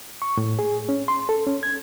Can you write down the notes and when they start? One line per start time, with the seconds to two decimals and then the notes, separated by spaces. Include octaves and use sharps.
0.22 C#6
0.37 A2
0.59 G#4
0.89 C#4
1.08 C6
1.29 A4
1.47 C#4
1.63 G#6